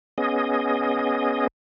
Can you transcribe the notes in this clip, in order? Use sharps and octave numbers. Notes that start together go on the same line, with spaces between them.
B3 C#4 G#4 D#5